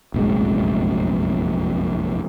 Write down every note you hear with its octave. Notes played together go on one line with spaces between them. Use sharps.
F1 A#1 F#2 G#3